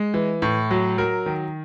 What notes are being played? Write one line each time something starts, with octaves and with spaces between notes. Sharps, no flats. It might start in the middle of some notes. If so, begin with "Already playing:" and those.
Already playing: G#3
E3
A2
F#3
F#3 A#4
D#3